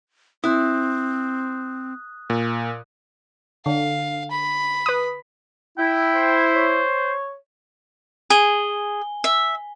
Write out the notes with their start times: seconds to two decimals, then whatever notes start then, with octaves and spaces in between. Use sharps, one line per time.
0.44 C4 E4 D#6 F#6
2.30 A#2
3.66 D3 F5
4.31 B5
4.86 B4 D#6
5.78 E4 G5
6.16 C5
6.55 C#5
8.30 G#4 G#5 G7
9.24 E5